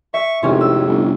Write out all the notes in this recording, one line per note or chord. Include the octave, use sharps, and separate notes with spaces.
E5 C#6
G#1 F2 A2 C3 C#4
E6
G1